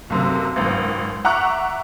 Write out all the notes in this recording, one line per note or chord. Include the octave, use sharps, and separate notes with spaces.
B1 F#2 C3
G#1 C#2 F#2
E5 F#5 A#5 C#6 D6 F#6